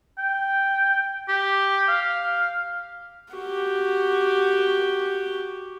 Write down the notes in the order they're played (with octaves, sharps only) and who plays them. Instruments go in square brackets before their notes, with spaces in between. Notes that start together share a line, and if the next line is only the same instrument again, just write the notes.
[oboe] G5
G4
F5
[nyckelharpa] F#4 G4